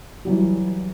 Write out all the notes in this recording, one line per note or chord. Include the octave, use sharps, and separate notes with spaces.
E3 F#3 G3